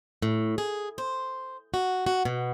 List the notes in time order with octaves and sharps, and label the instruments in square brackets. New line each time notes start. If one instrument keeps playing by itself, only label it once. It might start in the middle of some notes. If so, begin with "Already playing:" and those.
[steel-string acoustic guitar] A2
G#4
C5
F#4
F#4
B2